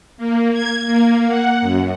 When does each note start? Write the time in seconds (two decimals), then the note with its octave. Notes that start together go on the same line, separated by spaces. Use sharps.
0.18 A#3
0.53 G#6
0.87 A#3
1.28 F#5
1.62 F#2